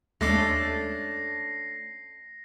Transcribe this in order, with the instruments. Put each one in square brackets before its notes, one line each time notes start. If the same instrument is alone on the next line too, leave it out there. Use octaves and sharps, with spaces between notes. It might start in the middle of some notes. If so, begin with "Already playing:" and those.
[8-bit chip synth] D#2 G#3 D6 [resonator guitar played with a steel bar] A3 C#4 D4 [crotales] A#6 C7